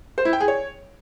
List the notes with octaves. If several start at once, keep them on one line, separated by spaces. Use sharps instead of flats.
C5
E4
G5
G#4
C#5